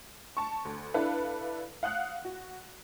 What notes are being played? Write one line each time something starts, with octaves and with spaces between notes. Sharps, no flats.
A5 C#6
D2
D4 E4 A4 B4 F5
F5 F#5 D#6 F#6
F#4